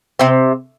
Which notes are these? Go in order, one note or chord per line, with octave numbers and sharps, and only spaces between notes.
C3 C4